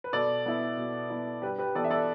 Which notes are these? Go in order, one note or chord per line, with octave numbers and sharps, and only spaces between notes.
B4
B2 A4 D5
B3 E4
B2
B3 E4
G2 G4 B4
G4 B4
E3 B3 A4 D5
E5
A4 D5